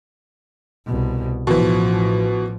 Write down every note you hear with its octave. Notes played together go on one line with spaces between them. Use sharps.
C2 B2
A1 B2 E3 F3